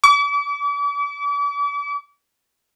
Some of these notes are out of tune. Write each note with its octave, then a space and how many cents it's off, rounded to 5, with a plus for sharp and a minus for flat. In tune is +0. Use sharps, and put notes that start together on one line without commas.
D6 -40